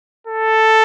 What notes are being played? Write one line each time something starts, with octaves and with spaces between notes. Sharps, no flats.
A4